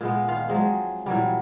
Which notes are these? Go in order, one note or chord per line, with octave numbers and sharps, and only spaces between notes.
A#2 G#3 B3
D#3 F4 F5
F3 F#3 G#3 C4
A#2 E3 F#3 G3